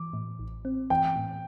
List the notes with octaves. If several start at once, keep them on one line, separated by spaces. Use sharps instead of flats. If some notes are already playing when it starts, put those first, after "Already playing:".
Already playing: E3 D6
A2
A1
C4
E3 G5
A2